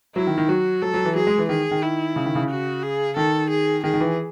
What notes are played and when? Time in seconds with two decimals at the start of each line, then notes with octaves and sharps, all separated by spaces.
0.15 F#3 E4
0.27 D#3
0.38 D#3
0.49 F#3 F#4
0.82 F#3 A4
0.94 F#3
1.05 E3
1.15 F#3 G#4
1.27 G#3
1.38 E3
1.49 D#3 G#4
1.71 D#3
1.83 E4
2.16 C#3
2.26 D#3
2.35 C#3
2.50 F#4
2.83 G#4
3.16 D#3 A4
3.50 G#4
3.84 D#3 G#4
3.94 D#3
4.01 E3